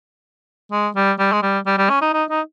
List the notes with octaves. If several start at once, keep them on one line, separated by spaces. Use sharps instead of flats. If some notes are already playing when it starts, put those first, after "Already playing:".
G#3
G3
G3
G#3
G3
G3
G3
C#4
D#4
D#4
D#4